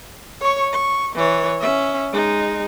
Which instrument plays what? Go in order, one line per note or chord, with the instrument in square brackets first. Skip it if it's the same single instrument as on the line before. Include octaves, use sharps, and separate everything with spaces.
[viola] C#5 C#6
C#6
E3 C#5
C#4 E5
G#3 D#4